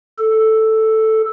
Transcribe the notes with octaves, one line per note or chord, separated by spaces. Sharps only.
A4